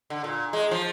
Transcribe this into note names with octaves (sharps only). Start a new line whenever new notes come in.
D3
A#2
G#3
F3